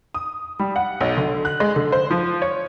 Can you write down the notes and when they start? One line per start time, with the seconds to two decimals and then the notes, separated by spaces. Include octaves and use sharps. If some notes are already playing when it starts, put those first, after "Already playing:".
0.14 D#6
0.59 G3
0.76 F#5
1.01 B1
1.17 D3
1.45 F#6
1.60 G#3
1.76 D3
1.92 C5
2.11 F3
2.42 C#5